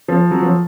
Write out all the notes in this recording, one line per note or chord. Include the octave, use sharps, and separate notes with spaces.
F3
F#3
F3